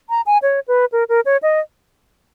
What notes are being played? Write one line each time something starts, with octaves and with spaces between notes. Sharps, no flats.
A#5
G#5
C#5
B4
A#4
A#4
C#5
D#5